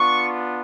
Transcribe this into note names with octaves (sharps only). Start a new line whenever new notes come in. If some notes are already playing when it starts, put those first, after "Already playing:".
Already playing: B3 D4 F4 C#6